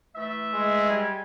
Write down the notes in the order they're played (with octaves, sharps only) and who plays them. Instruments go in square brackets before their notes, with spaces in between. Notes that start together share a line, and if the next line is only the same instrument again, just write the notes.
[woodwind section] E3 A3 E5
[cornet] G#3
[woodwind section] G3 G#5